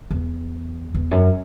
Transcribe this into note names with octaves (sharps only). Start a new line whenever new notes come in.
E2
E2
F#2